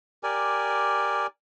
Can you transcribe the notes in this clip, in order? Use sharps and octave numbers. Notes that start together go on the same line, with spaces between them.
G4 A#4 D5 G#5